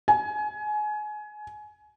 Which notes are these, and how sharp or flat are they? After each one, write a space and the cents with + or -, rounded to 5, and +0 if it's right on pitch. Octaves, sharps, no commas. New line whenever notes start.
G#5 +25